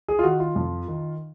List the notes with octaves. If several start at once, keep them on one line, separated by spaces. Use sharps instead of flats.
G#4
F4
D#3 F#4
F4
F2
D#3